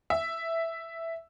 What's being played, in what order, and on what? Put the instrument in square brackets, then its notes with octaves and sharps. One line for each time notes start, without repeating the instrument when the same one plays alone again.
[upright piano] E5